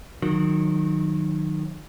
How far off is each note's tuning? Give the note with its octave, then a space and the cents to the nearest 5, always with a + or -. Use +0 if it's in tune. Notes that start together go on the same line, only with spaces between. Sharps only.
D#3 -20 F#3 -30